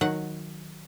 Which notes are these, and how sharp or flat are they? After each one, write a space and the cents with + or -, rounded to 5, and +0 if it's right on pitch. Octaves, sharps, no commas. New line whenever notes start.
D#3 +0 F#3 -10 F#5 +0